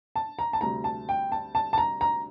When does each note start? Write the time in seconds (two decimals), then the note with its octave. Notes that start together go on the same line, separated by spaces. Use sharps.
0.16 A5
0.39 A#5
0.53 A5
0.61 D2 C3 G3 A#5
0.84 A5
1.09 G5
1.32 A5
1.55 A5
1.73 A5
1.78 A#5
2.01 A#5